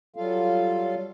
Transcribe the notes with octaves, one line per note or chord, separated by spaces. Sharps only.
F#3 G3 F4 A4 F5